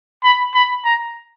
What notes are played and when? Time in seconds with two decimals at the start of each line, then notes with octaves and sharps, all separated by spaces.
0.24 B5
0.55 B5
0.85 A#5